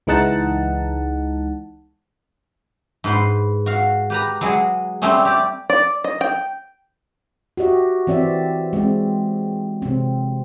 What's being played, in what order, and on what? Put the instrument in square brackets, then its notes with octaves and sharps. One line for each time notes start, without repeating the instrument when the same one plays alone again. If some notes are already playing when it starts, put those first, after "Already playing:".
[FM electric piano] C#2 E3 G#3 D#4 F#5 A5
[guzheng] G#2 B4 C6
F#4 F5
G4 B4 A#5
F#3 G#3 F#4 G#4
G3 A3 C4 C#4 G#4
G4 D5
[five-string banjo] D5
D#5
G5
[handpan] F#4 G4 D#5 E5
E3 C4 D5 E5
G#3 C4
C3 C4